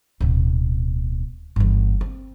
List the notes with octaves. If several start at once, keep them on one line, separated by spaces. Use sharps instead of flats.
D1 B2
G1 E2
C4